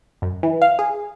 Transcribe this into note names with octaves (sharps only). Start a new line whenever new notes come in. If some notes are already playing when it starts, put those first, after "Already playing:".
F#2
E3
F5
G#4